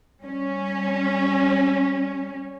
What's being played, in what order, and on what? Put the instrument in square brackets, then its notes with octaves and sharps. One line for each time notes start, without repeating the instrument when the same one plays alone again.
[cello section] G3 C#4